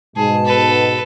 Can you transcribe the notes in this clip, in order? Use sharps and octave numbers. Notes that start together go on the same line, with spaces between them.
G#2 B2 G#4 A5
A4 B4